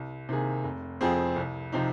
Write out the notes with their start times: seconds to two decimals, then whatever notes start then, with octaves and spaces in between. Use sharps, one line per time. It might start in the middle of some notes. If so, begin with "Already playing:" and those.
Already playing: C2
0.29 C3 D#3 A#3 G#4
0.64 F1
1.01 F2 F3 C4 G#4
1.36 C2
1.72 C3 F3 C4 D#4